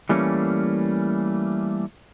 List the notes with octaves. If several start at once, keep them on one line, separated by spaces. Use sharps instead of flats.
E3 G3 A3 A#3 C#4